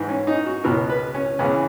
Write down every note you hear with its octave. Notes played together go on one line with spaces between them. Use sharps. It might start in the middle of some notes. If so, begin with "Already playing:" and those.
Already playing: G#2 E3
C#4
D#4
F#4
C#2 B2 A#4
B4
C#4
E2 C#3 E3 C#4